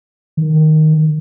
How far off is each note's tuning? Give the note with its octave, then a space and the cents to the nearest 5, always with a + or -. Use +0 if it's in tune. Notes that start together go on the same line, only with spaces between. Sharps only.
D#3 +0